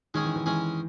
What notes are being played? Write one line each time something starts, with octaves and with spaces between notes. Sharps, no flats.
D#3 G#3 C#4 G#4
E3
E3
E3 G#3 C#4 G#4